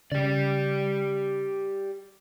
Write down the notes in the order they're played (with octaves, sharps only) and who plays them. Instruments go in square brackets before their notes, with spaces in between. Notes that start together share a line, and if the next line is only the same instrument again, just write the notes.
[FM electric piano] C#3 [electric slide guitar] G4 D5